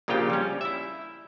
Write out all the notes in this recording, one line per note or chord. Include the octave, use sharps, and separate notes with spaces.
A#1 A#2 C#3 F4 G4 G5
G3 C#4
E4 E5